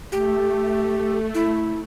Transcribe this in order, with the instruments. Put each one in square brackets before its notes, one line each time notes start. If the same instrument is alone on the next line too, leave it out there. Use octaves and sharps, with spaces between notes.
[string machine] A3 [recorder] G4
[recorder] E4